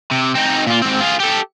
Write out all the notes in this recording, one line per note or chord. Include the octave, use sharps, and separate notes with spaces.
C3
C4 D#4
A#2 F4
G#2 C4
F4 G#4
G4 A4